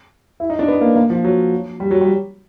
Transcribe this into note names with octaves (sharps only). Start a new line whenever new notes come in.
E4
D#4
D4
B3
A#3
A#3
F3
F#3
G3
F#3
G3